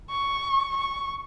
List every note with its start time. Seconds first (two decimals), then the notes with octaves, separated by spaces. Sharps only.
0.10 C#6
0.77 C#6